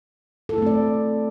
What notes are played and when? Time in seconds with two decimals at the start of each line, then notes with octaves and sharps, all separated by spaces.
0.49 A4
0.54 E4
0.58 A3
0.62 C4
0.66 D5